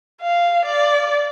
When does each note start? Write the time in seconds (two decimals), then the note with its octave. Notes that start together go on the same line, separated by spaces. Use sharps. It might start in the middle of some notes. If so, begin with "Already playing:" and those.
0.21 F5
0.66 D5